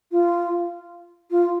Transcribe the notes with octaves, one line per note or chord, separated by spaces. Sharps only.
F4
F4